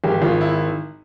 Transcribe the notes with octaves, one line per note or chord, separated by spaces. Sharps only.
G#1 G4
G#1 F4
E4